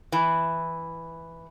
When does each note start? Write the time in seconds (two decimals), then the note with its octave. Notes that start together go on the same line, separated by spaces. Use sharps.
0.12 E3